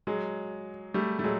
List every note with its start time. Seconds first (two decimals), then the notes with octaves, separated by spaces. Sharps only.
0.07 F#3 G#3
0.94 G3 A3
1.19 A3
1.23 F#3 G#3